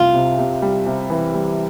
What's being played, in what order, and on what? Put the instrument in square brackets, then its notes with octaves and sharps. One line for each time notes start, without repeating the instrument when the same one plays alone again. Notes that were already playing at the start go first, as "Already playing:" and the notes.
Already playing: [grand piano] C2 [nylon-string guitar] F4
[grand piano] C3
C3
G3
C3
E3
G3